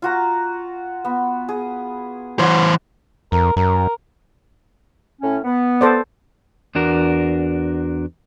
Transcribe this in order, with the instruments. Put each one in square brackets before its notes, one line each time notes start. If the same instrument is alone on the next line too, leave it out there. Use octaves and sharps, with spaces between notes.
[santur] F4 F#4 A#5
B3
G#4
[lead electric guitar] E3 C5 [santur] F#4 C#5
[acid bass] F2 [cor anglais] A#4
[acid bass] F#2 [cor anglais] A#4
[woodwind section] A2 C#4
B3
[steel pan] A4 C5 D5
[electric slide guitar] E2 D4 F#4 A#4